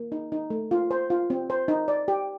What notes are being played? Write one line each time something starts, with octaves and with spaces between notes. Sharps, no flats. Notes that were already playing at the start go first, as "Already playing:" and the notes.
Already playing: A#3
D#4
D#4
A3
F4
C5
F4
C4
C5
D#4
D5
G4